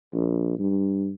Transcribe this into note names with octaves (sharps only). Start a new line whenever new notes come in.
A#1
G2